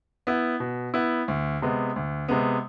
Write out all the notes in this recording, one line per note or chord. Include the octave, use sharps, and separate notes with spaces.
B3 E4
B2
B3 E4
D2
C3 G#3 B3
D2
C3 G#3 B3